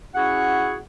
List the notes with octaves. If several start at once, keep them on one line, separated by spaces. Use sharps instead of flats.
C#4 E4 F#4 G#4 F#5